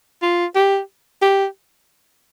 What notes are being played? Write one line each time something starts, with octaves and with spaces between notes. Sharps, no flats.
F4
G4
G4